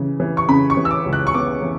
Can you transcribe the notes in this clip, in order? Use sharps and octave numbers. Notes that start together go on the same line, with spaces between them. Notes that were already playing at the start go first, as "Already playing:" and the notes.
Already playing: C#3 E3
E3
C#6
C#3 B5
C#6
E3
E6
D6
C#2
F#6
C#6
B3 D6
E3